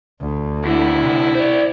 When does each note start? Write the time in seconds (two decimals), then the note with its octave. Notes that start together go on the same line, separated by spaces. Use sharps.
0.20 D2
0.65 E2 D3 E4
1.01 C3
1.35 C5 D5